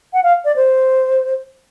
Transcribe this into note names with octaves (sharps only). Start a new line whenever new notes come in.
F#5
F5
D5
C5